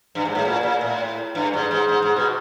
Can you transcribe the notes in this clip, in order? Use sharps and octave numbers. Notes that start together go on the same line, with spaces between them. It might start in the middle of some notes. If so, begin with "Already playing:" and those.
G2
G#2
A2
A#2
A#2
A2
G2
G#2
G#2
G#2
G#2
B2